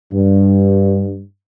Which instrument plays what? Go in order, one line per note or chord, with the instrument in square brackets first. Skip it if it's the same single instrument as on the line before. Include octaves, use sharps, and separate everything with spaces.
[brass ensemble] G2